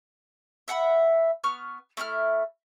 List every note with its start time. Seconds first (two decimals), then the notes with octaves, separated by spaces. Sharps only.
0.68 E5 F#5 G5 B5
1.44 B3 C#6 F6
1.97 A3 E4 F#5 F6